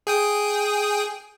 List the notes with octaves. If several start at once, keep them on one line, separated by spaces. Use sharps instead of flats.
G#4 G5 D#6